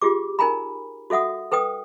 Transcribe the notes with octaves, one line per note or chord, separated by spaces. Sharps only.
F4 G4 G#4 D6
D#4 A#4 G#5 A#5 B5
F#4 A4 E5 F#5 D#6
A4 B4 G5 D#6